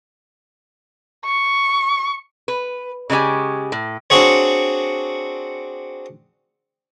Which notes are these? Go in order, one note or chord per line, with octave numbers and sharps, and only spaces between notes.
C#6
B4
C#3 G#3 D#4 G4 G#5
A2
C4 D4 F#4 G#4 C#5